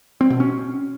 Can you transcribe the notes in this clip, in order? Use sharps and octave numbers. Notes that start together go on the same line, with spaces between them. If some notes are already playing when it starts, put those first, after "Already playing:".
C4
B2
C#4